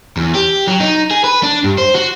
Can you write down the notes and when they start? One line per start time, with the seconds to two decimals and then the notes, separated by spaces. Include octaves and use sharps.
0.17 E2
0.34 G4
0.67 F#3
0.80 D#4
1.11 G#4
1.24 B4
1.43 D4
1.64 G2
1.78 C5
1.94 F#4